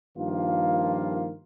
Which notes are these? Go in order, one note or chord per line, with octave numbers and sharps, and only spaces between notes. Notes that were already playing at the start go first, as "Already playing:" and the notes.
G2 D#3 F3 A#3 F4